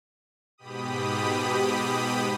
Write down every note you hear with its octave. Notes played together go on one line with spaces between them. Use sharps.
G#2 B2 G4 B5 D#6